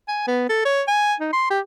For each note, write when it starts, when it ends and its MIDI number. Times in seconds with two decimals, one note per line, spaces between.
0.08 0.24 80
0.27 0.47 59
0.49 0.65 69
0.65 0.82 73
0.88 1.14 80
1.20 1.32 63
1.33 1.47 84
1.51 1.60 67